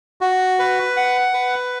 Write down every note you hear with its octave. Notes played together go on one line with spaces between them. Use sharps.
F#4
B4
F#5
B4